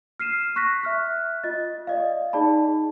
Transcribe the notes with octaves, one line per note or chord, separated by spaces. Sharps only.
F6 C7 D#7 E7
C#6 F#6 A#6 B6
E5 F6 F#6
F4 D#5 A6
D5 D#5 F5
D#4 G#4 D5 A5 B5